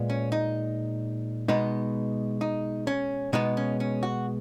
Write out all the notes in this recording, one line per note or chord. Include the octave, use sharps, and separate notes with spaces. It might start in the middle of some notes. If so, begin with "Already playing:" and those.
Already playing: A#2 G#3 B3
C#4
D#4
B2 G#3 B3 D#4
D#4
C#4
B2 G#3 B3 D#4
C#4
C#4
F#4